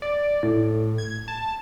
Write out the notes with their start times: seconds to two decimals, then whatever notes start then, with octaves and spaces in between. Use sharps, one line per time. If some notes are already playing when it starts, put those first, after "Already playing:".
0.02 D5
0.43 A2
0.98 G#6
1.28 A5